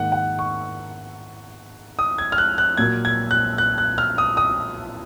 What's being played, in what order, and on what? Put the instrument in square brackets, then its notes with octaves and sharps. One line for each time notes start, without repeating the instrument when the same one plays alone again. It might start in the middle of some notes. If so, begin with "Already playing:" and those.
Already playing: [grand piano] G#2 D#3 A#3 F#5
F#5
C#6
D#6
G#6
F6
F#6
F#6
A#2 F#3 A#3 G#6
G#6
F#6
F#6
F#6
F6
D#6
D#6